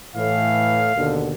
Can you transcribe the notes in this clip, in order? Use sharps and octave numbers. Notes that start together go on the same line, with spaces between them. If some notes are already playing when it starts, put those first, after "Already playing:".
A2 E3 F5
D#2 B2 D3